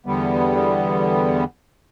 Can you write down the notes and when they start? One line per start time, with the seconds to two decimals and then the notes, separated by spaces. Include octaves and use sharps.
0.06 E2 D3 G3 B3